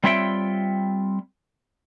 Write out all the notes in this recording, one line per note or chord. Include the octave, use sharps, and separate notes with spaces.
G3 C4 F4 C#5 E5 G5